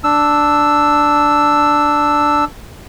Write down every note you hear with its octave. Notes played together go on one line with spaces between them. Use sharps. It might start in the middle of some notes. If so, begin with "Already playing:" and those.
D4 E6